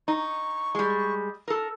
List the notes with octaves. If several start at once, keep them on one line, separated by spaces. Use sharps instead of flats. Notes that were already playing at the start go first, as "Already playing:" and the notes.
D#4 C#6
G3 G#3
A4 A#4